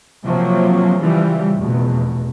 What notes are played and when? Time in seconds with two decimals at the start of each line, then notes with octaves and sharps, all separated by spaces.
0.23 C3 F3 F#3 A#3
1.00 C#3 E3 F3 G3
1.55 F1 E2 B2